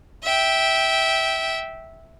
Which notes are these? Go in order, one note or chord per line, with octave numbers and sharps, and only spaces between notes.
E5 G5